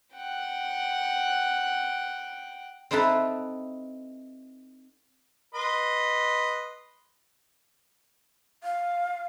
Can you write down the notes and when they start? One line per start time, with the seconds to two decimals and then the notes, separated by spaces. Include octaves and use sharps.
0.14 F#5 G5
2.91 C4 D#4 E4 A4 B4
5.55 B4 D#5 C6
8.64 F5